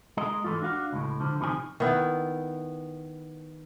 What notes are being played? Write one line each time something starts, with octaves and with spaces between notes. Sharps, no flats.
G#3 A#4 D#5
G#2 E3 F3 A3 F4
D4 F#4 F5
C#2 A2
D3 F3
D2 A2 C3 D#3 F3 G#5
D#3 B3 E4